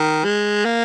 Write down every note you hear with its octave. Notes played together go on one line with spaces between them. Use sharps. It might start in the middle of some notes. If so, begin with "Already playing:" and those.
Already playing: D#3
G#3
A#3